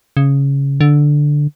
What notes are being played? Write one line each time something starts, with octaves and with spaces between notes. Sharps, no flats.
C#3
D3